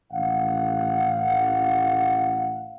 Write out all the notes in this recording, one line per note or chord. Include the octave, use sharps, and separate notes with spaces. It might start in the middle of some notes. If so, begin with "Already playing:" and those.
A1 F5 F#5